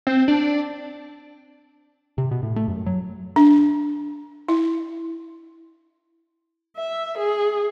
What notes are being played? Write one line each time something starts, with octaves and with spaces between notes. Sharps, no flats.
C4
D4
C3
B2
A2
A3
F#2
F#3
D4
E4
E5
G#4